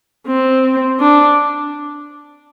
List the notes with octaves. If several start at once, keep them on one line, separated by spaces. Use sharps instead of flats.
C4
D4